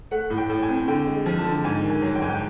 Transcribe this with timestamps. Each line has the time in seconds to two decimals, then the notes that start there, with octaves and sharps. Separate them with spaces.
0.11 A3 F#5
0.30 A2
0.38 G5
0.49 A2
0.62 G#5
0.69 C4
0.88 D3 G5
1.07 G#3
1.26 F3
1.39 A5
1.45 D3
1.64 G#2 G#5
1.83 D#3
1.89 G#5
2.02 F#3
2.15 G5
2.22 G#2 G#5
2.29 G5